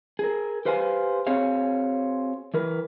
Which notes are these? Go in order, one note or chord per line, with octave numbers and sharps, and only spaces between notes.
G#4 A#4
G4 B4 C5 F5 F#5 G#5
C4 F#4 G#4 C#5 F5
E3 A#4 B4